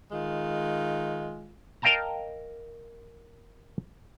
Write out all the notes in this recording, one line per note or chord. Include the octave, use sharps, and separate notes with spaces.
D#3 G#3 F4
A#4 D#5 F5 G5 A5 A#5